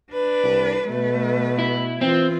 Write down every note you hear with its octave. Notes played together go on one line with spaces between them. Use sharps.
D4 B4
C2
B2 A3 B4
E4
E3 C4 F4